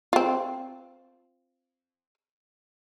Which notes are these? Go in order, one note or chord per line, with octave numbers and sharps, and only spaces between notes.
C4 F4